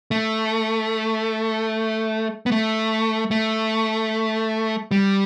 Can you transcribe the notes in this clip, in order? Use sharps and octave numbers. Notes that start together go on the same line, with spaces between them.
A3
B3
A3
A3
G3